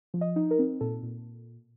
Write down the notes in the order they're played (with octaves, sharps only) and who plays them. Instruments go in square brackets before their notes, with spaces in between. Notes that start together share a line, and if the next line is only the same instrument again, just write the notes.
[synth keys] F3
D#5
D#4
A#4
C4
A#2 A4
A#2